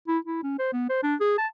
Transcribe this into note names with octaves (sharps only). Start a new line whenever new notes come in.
E4
E4
C#4
C5
B3
C5
D4
G#4
A5